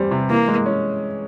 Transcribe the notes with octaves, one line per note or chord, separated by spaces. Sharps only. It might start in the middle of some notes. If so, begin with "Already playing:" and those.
Already playing: E2 G3 C4
C3
E3 A#3
G#3
C#4